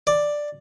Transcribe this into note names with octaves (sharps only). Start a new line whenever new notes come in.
D5